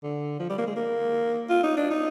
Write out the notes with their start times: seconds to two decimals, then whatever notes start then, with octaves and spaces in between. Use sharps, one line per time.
0.03 D3
0.40 F3
0.50 G3
0.58 A#3
0.67 G#3
0.76 A#3
1.50 F4
1.64 D#4
1.77 D4
1.91 D#4